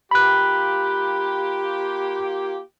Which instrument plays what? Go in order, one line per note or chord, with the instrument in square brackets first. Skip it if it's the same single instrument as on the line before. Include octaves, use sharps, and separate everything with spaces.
[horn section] A#3 F4 G4 [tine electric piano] B5 F#6